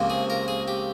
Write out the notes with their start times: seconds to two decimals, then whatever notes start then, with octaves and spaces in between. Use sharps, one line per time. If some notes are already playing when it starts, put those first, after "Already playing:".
Already playing: C#2 C3 F3 A#3
0.10 G#4
0.30 A#4
0.48 G#4
0.68 G4